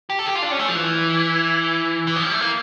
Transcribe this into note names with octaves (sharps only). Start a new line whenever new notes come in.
G4
A4
G4
F4
D4
C#4
A3
F3
E3
E3
F3
G3
A3
A#3